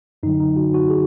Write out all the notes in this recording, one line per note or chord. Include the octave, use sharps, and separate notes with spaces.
F#2 D3 F#3 D#4
D#4
F#4
F#4
G#4